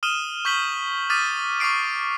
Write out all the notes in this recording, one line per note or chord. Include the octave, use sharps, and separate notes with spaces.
D#6 F6 D#7 E7 G7
C#6 G6 B6 F#7 G7
D6 D#6 F6 A6 B6 D#7
C#6 D6 F6 C7 D7